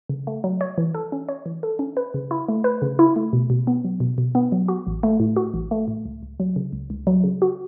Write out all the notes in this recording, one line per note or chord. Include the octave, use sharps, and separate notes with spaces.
C#3
A3
F#3
C#5
E3
A4
C#4
C#5
E3
A4
C#4
B4
C#3
E4
A3
B4
C#3
E4
A3
B2
B2
B3
F#3
B2
B2
B3
F#3
F#4
A1
A3
A2
F#4
A1
A3
A2
C#2
C#2
F#3
C#3
C#2
C#2
F#3
C#3
F#4